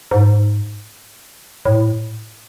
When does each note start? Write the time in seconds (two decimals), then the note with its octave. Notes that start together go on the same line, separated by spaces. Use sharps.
0.11 G#2
1.65 A2